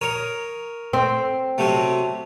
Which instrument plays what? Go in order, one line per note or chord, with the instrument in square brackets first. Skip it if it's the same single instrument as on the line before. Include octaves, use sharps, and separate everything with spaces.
[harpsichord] A#4 C#5 D#6
[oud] C4
[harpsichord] C3 F#3 A3